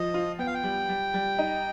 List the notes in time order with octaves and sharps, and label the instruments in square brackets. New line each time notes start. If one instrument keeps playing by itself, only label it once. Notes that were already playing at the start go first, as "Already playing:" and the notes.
Already playing: [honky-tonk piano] F3 [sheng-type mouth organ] D#5
[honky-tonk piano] F4
[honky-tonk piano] B3 [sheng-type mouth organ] G5
[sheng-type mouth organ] F5
G5
[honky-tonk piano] G3
G3
G3
D#4